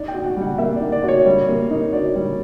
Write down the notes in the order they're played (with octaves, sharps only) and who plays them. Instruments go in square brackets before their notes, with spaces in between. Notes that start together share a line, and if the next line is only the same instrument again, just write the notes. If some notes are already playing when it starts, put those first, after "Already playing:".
Already playing: [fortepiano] D#4 [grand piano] D5
[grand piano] G5
[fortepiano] F#4
[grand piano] F#5
[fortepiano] G3
[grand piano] F#5
[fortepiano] A#3 [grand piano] E5
[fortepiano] D#4 [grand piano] D5
[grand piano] D5
[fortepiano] F#4 [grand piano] C#5
[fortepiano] G3
A#3
D#4
[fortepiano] F#4 [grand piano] D5
[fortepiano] G3